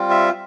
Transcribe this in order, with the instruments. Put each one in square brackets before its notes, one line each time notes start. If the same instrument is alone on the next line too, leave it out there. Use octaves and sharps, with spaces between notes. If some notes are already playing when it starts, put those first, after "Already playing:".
Already playing: [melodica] G3 C4 F4
E5